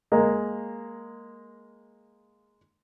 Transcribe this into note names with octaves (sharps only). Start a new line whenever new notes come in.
G#3 A#3